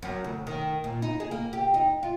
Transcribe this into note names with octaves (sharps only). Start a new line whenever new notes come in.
F#2
D2
D#3
A#2
D#4
G#4
A#3
G4
D#4
F4